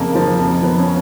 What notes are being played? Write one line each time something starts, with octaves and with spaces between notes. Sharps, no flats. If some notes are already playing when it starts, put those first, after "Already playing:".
Already playing: F2 C#3 A#3
F3
F2
F3 B3
C#4